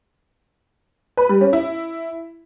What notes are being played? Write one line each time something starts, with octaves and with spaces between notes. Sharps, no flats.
B4
G3
C#4
E4